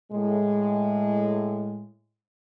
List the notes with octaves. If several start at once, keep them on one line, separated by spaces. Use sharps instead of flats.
A2 G#3